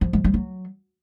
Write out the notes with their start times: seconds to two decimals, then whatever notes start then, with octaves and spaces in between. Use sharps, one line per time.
0.01 F3
0.13 G#3
0.24 G3
0.34 F#3